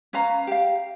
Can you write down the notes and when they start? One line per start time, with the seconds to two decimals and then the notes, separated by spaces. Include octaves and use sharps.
0.13 C#4 B4 F5 A#5
0.47 G4 F5